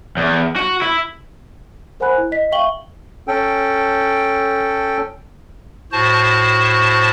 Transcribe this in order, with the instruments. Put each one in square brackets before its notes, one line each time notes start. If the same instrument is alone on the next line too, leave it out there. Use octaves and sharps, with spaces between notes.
[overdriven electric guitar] E2
F#4
E4
[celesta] A#4 C5 F#5 G#5 B5 F#6
E4
D#5 B6
E5 F5 G5 C#6 F#7 G7
[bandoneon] C#4 A4 G5
[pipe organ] A2 F#4 C5 A5